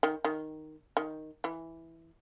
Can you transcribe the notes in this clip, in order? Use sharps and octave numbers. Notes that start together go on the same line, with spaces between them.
D#3
D#3
D#3
E3